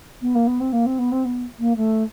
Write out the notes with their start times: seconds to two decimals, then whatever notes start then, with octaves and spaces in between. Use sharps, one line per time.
0.21 B3
0.35 A#3
0.47 B3
0.60 C4
0.72 A#3
0.86 C4
0.98 B3
1.11 C4
1.25 B3
1.59 A#3
1.76 A3